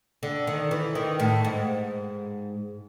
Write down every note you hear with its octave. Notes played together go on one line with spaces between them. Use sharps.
D3
D#3
E3
D#3
A2
G#2